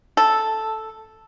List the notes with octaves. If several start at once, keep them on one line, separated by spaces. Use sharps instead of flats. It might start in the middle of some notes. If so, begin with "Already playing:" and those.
A4